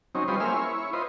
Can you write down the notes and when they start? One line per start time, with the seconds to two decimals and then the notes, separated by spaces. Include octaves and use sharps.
0.15 F#3 C4 C#4 D#4
0.28 G3 C#4 F4 B4 C5 D#5
0.40 A#3 C#4 G#4 C5 E5 F6
0.54 E4 C#5
0.93 F4 B4 C5 D#5